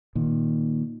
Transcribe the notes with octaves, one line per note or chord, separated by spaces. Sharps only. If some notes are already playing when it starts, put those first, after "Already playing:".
A#2 D#3